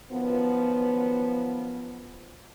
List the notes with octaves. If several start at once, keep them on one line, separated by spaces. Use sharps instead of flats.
F#2 D#3 F3 B3